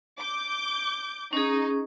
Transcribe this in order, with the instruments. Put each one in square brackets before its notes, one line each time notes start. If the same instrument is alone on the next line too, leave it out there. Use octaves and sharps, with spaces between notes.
[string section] D6 G6
[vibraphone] C#4 G#4 [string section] D#4